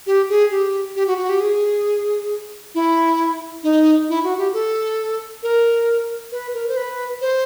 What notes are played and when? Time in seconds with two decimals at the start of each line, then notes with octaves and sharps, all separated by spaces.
0.07 G4
0.29 G#4
0.51 G4
0.96 G4
1.07 F#4
1.18 F#4
1.29 G4
1.40 G#4
2.75 E4
3.63 D#4
4.09 E4
4.24 F#4
4.38 G4
4.53 A4
5.43 A#4
6.32 B4
6.54 A#4
6.68 C5
6.77 B4
7.21 C5